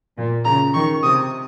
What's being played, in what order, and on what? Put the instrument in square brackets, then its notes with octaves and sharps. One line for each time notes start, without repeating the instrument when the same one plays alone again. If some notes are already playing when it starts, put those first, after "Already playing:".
[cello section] A#2
[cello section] C#3 [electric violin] A#5
[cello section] D#3 [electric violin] C#6
[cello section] C3 [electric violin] D#6